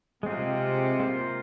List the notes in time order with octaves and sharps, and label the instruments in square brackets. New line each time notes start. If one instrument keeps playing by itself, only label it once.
[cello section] C3 [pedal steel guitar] G#3 C4 F4
[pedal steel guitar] A#3 F4 C5